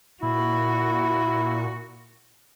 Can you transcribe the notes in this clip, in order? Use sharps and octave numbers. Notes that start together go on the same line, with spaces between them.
A#2 E4 F#4